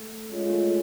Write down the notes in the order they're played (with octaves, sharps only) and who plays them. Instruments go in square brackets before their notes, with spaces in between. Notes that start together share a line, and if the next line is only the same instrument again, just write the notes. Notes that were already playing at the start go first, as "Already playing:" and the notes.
Already playing: [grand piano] A3
[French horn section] G#3 C#4 F4
[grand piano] A3